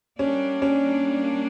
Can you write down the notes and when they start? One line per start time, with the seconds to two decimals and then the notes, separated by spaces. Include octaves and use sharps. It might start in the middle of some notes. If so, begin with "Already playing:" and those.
0.19 G3 A#3 C#4 D4
0.62 C#4